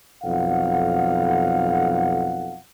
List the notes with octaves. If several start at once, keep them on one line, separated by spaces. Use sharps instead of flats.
B1 F2 F5 F#5